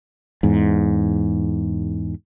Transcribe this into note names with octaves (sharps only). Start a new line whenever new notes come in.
E2 G#2